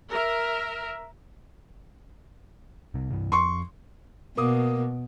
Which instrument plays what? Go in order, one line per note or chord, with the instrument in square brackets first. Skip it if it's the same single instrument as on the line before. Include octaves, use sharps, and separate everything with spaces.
[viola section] A#4 E5
[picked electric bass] C2 C3
C2 G2 E3
[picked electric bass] F2 [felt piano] C6 C#6
[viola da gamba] B2 [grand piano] A#3 D6 D#6